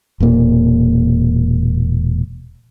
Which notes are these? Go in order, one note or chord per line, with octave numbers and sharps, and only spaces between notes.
E1 A#2 A#3